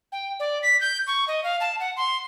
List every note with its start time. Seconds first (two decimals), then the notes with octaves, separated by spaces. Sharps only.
0.12 G5
0.40 D5
0.63 B6
0.81 G6
1.07 C#6
1.28 D#5
1.44 F5
1.61 A5
1.80 F#5
1.97 C6